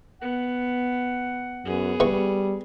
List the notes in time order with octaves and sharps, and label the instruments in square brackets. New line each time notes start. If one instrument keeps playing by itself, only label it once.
[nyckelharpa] B3 [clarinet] F#5
[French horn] F#2 [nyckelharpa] B3 G#4
[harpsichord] E2 C#6 [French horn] G3